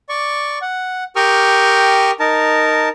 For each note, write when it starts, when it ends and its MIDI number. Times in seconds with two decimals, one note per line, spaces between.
0.09 0.59 74
0.09 0.59 85
0.62 1.04 78
1.16 2.11 67
1.16 2.11 70
1.16 2.11 79
1.16 2.11 85
1.16 2.11 87
1.16 2.11 89
2.20 2.89 63
2.20 2.89 70
2.20 2.89 81